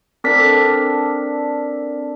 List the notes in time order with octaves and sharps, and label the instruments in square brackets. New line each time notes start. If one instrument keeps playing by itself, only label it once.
[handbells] C4 A#4 B6 [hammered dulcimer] D4 A4